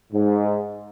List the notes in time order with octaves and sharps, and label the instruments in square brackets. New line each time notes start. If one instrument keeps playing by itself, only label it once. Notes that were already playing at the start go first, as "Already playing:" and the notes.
[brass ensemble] G#2